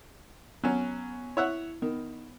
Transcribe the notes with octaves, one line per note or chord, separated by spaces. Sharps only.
F#3 B3 C#4
E4 C#5 E5 F#5
D#3 B3